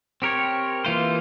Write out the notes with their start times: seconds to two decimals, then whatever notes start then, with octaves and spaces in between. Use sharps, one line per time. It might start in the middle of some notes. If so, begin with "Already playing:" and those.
0.22 C4 G4 A#4 C#5
0.85 E3 A#3 F4 C5